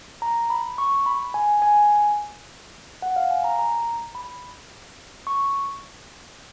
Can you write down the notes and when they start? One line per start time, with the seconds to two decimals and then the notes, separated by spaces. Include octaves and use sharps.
0.22 A#5
0.50 B5
0.78 C#6
1.06 B5
1.34 G#5
1.62 G#5
3.02 F#5
3.16 F5
3.31 G#5
3.44 A#5
3.59 A#5
4.15 B5
5.27 C#6